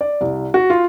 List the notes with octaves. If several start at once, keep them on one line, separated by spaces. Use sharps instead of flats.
D5
C2
F#4
F4